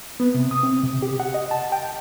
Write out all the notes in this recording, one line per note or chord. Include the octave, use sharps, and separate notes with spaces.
B3
C3
D#6
C4
C3
G4
F#5
D#5
A5
G5